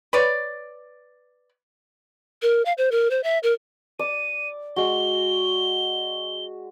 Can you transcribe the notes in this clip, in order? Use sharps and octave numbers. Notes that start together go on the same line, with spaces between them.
B4 C#5 D5
A#4
F5
C5
A#4
C5
E5
A#4
D5 D#7
G#3 F#4 G7